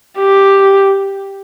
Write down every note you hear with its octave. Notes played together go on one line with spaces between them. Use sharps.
G4